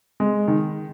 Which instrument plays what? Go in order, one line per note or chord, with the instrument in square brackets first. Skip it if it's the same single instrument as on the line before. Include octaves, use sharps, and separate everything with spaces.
[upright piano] G#3
D#3